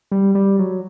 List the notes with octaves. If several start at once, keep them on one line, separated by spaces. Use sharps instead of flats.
G3
G3
F#3